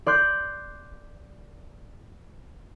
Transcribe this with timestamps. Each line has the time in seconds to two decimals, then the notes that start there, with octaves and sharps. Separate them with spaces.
0.06 D5 C6 F#6 G6